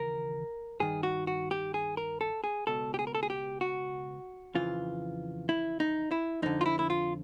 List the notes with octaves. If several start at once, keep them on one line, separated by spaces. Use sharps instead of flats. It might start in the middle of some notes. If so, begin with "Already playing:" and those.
Already playing: D#2 C#3 E3 A#4
G2 D#3 G#4
F#4
F#4
G4
G#4
A#4
A4
G#4
C#2 B2 A4
G4
G#4
A#4
A4
G#4
G4
F#4
F2 C#3 E3 F4
E4
D#4
E4
F2 D3 D#4
F4
E4
E4
F4